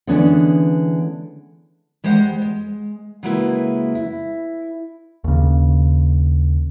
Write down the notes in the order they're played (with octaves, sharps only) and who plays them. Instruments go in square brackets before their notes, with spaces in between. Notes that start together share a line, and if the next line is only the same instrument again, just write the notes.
[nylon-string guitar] D3 E3 G#3 B3 C#4 D4
[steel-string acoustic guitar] G3 G#3 G4 C5 C#5 F#5
G#3
C#3 F#3 G#3 A#3 E4 B4
E4
[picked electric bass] D#2 C#3